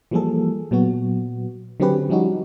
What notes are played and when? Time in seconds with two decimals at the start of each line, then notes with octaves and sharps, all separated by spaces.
0.11 E3 F3 G3 A#3 G#4 A4
0.71 A#2 F#3 B3 F#4
1.80 D3 F#3 C4 C#4 G4 B4
2.09 F3 G3 C#4 D#4 F#4